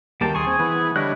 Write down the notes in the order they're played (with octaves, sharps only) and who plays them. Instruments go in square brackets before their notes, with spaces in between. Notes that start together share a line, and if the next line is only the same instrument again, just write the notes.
[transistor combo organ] D#2 G5 [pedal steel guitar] G3 A#3 A5
[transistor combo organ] D#2 C6 [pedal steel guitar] G#4 G#5 C#6
[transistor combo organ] C4
E3 B3
[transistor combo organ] D3 G3 C#5 [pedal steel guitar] E4 D#5 F#6